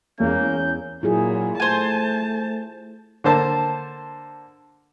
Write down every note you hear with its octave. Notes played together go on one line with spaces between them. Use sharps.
E2 G#3 A#3 C#4 G6
A#2 F#3 E4 F4 G#4
A3 C5 G#5 A5
D3 A#3 C5 A5